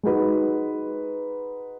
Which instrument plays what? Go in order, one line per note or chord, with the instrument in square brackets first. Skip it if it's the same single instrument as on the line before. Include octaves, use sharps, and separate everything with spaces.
[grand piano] G#3 D#4 F#4 B4